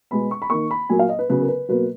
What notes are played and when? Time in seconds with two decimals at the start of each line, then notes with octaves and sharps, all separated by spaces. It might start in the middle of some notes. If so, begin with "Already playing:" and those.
0.11 B2 G#3 B3 B5
0.31 C#6
0.42 B5
0.50 D#3 A#3 C#6
0.71 B5
0.89 A#2 F#3 A#3 G#5
0.99 F5
1.09 D#5
1.19 B4
1.30 C#3 F#3 B3 B4
1.42 A#4
1.48 B4
1.69 B2 F#3 A#3 B4